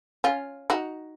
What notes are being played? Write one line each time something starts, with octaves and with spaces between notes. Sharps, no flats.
C#4 F4
D#4 F#4